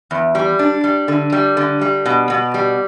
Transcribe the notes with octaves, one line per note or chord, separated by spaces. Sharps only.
E2
G3
D4
G3
D3
G3
D3
G3
B2
B2
G3